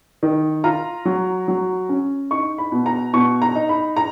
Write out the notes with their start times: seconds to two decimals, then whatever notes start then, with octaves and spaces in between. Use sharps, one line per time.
0.23 D#3
0.64 F4 A#5
1.05 F#3
1.48 F#3
1.89 C#4
2.31 D#4 C#6
2.58 B5
2.72 B2
2.86 A#5
3.13 B2 C#6
3.42 A#5
3.55 D#4
3.69 B5
3.97 A#5